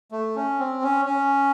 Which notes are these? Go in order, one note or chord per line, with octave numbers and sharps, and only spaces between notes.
A3
C#4
C4
C#4
C#4